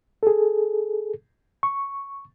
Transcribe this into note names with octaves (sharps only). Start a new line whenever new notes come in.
G#4 A4
C#6